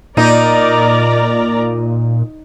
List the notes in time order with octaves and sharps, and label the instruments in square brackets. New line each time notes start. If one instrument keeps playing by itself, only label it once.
[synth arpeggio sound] A#2 [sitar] D#4 [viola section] A#4 D5 A#5